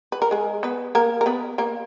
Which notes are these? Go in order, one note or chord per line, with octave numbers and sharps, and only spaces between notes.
B4
A#4
G#3 G#4
B3 B4
A#3 A#4
A#4
B3 B4
A#3 A#4